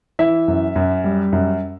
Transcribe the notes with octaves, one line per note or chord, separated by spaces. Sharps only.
E3 E5
F#2
F#2
G3
F#2